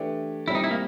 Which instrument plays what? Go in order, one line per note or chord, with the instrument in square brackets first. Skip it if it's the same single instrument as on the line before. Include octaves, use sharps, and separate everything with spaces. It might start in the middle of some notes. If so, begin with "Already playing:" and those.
Already playing: [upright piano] E3 A3 D4 G4
[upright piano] A#2 G3 C4 [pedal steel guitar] E4
[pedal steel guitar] D#4
E4
A#3